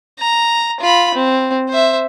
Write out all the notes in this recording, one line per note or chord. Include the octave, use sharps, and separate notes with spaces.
A#5
F4 B5
C4
C5 E5